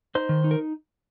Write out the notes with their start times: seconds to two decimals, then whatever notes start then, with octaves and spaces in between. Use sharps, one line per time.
0.15 D#4 C5
0.29 D#3
0.44 D#4
0.51 A#4